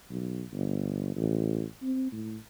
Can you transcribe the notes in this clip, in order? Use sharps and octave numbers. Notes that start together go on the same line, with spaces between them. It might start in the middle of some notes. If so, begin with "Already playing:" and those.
B1
G1
A1
C4
A2